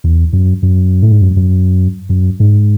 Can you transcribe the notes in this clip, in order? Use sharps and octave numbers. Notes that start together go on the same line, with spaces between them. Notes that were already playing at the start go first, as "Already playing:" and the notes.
E2
F#2
F#2
A2
G#2
F#2
F#2
F#2
G#2